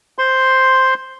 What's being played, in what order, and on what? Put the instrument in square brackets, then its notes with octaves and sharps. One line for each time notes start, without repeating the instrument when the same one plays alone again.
[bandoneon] C5 C6